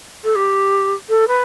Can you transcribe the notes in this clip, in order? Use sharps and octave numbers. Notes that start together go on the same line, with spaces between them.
A4
G4
A4
B4